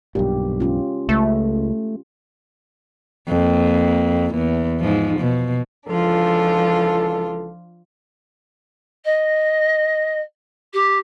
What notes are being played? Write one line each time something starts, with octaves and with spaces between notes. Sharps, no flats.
B1 G2 A#2 G4
G#3 C#4 F4
C#2 A3
F2 A#3
E2
G#2 F3
B2
C#2 E3 F3 D4 F4 A4
D#5
G4